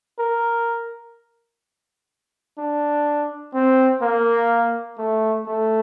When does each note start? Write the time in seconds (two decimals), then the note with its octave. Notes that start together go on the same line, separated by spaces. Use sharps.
0.18 A#4
2.58 D4
3.54 C4
4.01 A#3
4.98 A3
5.46 A3